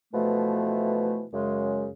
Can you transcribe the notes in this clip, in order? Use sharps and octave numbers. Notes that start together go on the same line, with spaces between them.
B2 E3 F3 A3
F#2 C#3 G#3